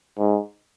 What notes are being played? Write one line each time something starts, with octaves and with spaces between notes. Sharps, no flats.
G#2